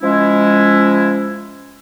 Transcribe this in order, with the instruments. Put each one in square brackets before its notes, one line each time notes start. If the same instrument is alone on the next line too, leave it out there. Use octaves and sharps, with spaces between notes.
[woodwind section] F3 G#3 C#4 E4